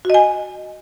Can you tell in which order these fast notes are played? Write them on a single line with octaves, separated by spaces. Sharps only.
F#4 D#5 G#5